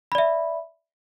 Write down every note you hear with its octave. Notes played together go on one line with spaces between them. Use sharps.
D5 E5 B5